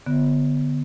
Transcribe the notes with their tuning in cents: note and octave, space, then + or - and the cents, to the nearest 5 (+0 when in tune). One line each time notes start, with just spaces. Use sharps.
D3 +0 B3 +0